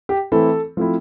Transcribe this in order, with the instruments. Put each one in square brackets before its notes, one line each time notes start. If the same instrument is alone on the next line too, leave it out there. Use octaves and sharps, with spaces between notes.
[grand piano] G4
E3 A3 C4 E4 A4
F3 A3 C4 E4